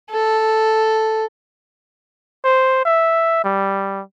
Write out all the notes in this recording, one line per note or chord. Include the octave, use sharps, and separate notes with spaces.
A4
C5
E5
G3